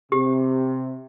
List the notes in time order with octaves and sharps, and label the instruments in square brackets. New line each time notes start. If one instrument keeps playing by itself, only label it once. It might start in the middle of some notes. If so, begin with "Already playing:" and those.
[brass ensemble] C3 [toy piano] G4